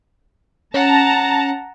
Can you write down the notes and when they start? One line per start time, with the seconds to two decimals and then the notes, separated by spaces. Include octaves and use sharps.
0.74 C#4 F#5 A5 A#5